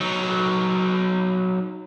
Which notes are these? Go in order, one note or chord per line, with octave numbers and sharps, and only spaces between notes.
F#3 D#4